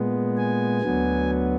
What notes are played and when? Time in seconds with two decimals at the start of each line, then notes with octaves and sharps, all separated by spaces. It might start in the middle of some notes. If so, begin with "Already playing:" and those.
Already playing: A#2 G#3 B3
0.37 G#5
0.81 D2 D3 F#3 B3